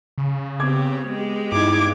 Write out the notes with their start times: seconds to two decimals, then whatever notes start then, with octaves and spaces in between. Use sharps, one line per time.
0.18 C#3
0.60 B3 C4 G4 D6 G#6
1.07 G#3 B3 G4
1.52 G2 D#4 E4 D6 G#6